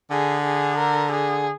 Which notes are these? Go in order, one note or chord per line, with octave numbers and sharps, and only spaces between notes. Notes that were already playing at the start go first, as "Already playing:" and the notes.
D3 G#4
G#4
A#4
G#4